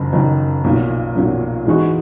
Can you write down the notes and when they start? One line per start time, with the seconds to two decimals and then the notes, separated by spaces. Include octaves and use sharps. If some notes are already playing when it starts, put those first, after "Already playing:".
Already playing: F#1 F#2 D#3
0.13 F#1 F#2 D#3
0.64 B1 A#2 F#3
1.15 B1 A#2 F#3
1.66 G#2 E3 G#3 D#4 F#4